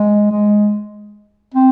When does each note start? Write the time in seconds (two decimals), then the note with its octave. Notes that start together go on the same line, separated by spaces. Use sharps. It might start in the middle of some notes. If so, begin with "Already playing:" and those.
Already playing: G#3
0.31 G#3
1.54 C4